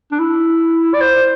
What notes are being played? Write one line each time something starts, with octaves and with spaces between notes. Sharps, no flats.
D4
E4
D5
C5